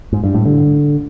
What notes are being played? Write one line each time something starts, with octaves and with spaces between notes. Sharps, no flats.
G#2
G2
A2
D3